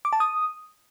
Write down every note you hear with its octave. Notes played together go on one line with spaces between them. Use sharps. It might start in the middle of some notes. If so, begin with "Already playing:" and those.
D6
A5
D#6